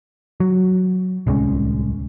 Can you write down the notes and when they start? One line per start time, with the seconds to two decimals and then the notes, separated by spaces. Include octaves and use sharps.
0.40 F#3
1.27 D1 C2 G#3 C#4